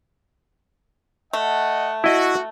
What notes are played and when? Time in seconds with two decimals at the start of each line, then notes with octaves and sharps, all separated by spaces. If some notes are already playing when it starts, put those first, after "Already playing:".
1.33 A3 D#5 F#5
2.04 E4 F#4 D#5